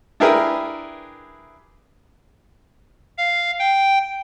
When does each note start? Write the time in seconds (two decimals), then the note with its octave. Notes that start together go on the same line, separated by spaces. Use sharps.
0.20 D4 E4 G4 G#4 A#4 B4
3.18 F5
3.59 G5